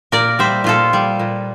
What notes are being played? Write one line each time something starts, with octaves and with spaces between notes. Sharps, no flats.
A#2 A#4 D5
G3 C5 E5
A#2 F4 A4
G3
A#2